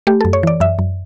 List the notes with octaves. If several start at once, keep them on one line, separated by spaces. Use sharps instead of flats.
A3 G4
F#2 A4
C#5
E3 D5
F#2 E5
F#2